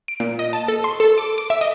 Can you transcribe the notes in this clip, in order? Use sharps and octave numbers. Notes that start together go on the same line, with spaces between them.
D7
A#2
D#5
A5
A4
C6
A4
D6
D6
E5
D#5